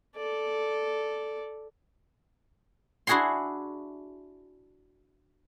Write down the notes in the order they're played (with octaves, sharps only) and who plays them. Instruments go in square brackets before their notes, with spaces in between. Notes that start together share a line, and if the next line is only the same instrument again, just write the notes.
[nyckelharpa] A4 D5
[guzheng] D4 E4 F#4 G#4 F#5 C6